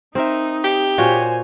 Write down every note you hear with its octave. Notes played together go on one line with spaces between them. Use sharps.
C4 D#4 A#4 E5
G4
A#2 F#4 C5 C#5 G#5